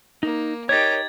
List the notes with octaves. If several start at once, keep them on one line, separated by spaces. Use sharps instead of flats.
A#3 D#4
D#4 G4 A#4 C#5 G#6 A6